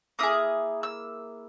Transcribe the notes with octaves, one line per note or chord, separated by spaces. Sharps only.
A#3 E4 G#4 D#6
E6